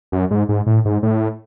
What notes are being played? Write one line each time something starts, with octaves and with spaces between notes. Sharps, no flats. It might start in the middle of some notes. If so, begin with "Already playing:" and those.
F#2
G#2
G#2
A2
G#2
A2